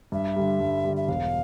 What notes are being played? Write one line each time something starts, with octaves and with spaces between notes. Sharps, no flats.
G2 E5
D3 G3
G2
D3 G3
E5
E1 F5